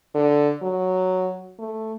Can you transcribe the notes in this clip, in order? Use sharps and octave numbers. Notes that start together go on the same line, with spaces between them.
D3
F#3
A3